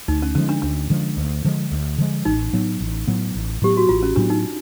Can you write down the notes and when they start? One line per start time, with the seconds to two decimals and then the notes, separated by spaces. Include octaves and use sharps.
0.08 D2 D#4
0.22 C#4
0.35 D3 F3 G#3 C#4
0.49 D4
0.62 D2 D4
0.90 D3 F3 G#3
1.17 D2
1.44 D3 F3 G#3
1.72 D2
1.98 D3 F3 G#3
2.25 A1 D#4
2.53 A2 F#3 B3
2.80 A1
3.07 A2 F#3 B3
3.35 A1
3.62 A2 F#3 B3 G4
3.77 F#4
3.89 A1 F4
4.03 C#4
4.16 A2 F#3 B3 D4
4.30 D#4